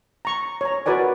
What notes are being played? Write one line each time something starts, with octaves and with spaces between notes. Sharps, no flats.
A#5 C#6
C#5 A#5
F#4 A#4 B4 D5 G#5